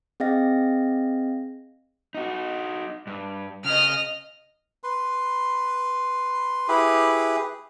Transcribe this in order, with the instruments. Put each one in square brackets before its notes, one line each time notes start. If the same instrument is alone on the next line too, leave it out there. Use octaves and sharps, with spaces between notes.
[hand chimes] C4 G#4 D#5 F5 G5 A#6
[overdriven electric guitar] D#4 F#4
G2
[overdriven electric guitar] C#3 [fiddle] D#5 F6
[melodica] B4 C6
E4 G4 G#4 B4